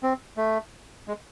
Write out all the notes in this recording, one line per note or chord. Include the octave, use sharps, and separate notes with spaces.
C4
A3
G#3